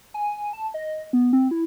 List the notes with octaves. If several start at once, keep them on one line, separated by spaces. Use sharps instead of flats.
G#5
A5
D#5
B3
C4
E4